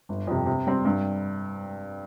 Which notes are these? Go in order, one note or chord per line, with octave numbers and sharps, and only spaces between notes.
G1
F2 C3
C3
G3 C4
G2